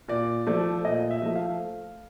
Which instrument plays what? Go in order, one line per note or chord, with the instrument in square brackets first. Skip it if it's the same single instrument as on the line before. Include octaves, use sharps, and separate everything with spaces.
[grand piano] A#2 D5
F3 A3 D5
A#2 D#5
E5
F3 A3
F5